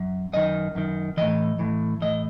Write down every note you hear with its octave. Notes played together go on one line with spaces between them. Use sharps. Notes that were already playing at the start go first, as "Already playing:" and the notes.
Already playing: F#2
F#2 D#3 D#5
F#2 D#3
A2 E3 D#5
A2 E3
A2 E3 D#5